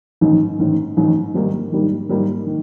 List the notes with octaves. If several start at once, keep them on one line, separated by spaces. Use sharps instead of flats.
A1 G#2 D#3
A1 G#2 D#3
A1 G#2 D#3
G#2 D#3 G3 A#3
G#2 D#3 G3 A#3
G#2 D#3 G3 A#3
D#3